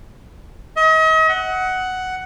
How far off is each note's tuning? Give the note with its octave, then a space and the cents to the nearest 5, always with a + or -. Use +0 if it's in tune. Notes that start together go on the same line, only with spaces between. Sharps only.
D#5 +40
F#5 +5